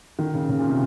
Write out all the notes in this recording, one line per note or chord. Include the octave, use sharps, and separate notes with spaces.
D#3
C#3
C#3
A#2
C3